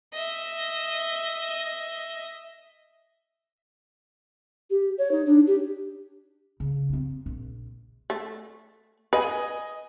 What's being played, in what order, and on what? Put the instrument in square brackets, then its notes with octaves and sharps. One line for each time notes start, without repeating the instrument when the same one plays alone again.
[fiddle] D#5 E5
[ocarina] G4
C#5
D#4
D4
G4
[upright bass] C#3
C4 D4
A#1
[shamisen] A3
[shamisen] B4 [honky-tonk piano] D#5 G#5